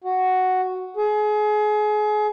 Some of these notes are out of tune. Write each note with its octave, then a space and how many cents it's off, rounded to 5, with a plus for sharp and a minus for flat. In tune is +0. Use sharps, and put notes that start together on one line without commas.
F#4 +0
G#4 +30